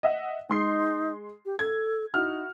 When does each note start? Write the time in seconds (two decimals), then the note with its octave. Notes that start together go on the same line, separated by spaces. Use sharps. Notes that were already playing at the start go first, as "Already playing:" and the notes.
0.03 D#5 E5 F#5
0.49 G#3 D#4 C6 C7
1.45 G4
1.59 A4 G#6
2.14 D#4 E4 F#4 F6